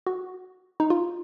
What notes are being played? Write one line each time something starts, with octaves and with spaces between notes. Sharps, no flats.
F#4
D#4
F4